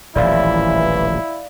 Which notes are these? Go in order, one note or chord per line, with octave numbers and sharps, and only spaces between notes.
D#1 A1 E3 F3 E4 D5 F5